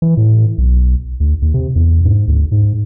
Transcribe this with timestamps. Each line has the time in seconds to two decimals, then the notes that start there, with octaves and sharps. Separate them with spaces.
0.02 E3
0.17 A2
0.58 B1
1.20 D2
1.42 D#2
1.54 C3
1.76 E2
2.05 G#2
2.28 D2
2.52 G#2